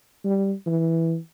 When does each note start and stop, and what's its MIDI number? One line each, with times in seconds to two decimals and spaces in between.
0.25 0.53 55
0.66 1.16 52